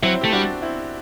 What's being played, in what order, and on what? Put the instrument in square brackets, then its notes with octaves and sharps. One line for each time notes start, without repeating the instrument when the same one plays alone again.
[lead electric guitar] F#3 [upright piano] C4 E4
[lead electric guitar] A3 [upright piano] G4
[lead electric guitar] G3 [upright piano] D4 F#4
[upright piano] C4 E4